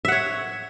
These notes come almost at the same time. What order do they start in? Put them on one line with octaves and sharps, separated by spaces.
E5 F#5 C#5